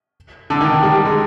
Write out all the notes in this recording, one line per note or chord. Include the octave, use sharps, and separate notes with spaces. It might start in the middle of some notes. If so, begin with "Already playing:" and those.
D3
D#3
G3
G#3